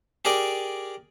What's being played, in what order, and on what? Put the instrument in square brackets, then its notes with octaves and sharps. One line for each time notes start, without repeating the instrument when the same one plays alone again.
[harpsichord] G4 G#4 A#4 D5 G#5